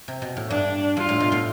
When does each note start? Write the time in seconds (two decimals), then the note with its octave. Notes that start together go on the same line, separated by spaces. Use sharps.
0.08 C3
0.22 B2
0.37 A2
0.50 G2 D4
0.97 G2 F4
1.09 A2
1.20 B2
1.32 A2